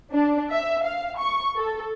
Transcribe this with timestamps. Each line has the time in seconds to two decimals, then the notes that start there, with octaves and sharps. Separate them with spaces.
0.12 D4
0.51 E5
0.84 F5
1.18 C#6
1.56 A4